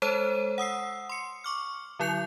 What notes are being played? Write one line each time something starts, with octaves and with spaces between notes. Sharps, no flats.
G#3 A4 C5 C#5 A5 D#7
F#5 D#6 E6 C7
C6 C#7
C#6 D6 F6
D3 F#3 E4 G6 C#7 F7